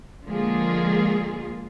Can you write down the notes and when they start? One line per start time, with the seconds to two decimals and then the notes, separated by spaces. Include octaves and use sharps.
0.25 D3 F3 G#3 A#3 F4 G#4